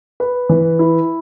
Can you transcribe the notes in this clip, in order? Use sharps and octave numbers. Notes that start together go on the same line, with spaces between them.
B4
E3
E4